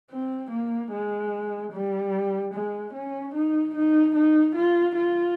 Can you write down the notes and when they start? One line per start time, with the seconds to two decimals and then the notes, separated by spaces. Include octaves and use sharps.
0.11 C4
0.51 A#3
0.92 G#3
1.72 G3
2.54 G#3
2.94 C#4
3.34 D#4
3.75 D#4
4.15 D#4
4.56 F4
4.96 F4